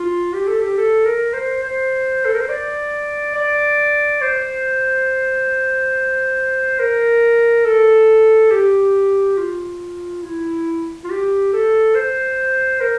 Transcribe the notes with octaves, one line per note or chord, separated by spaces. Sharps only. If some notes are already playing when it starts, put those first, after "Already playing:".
Already playing: F4
G4
A4
G4
A4
A#4
C5
C5
A4
A#4
C5
D5
D5
C5
A#4
A4
G4
F4
E4
F4
G4
A4
C5
A#4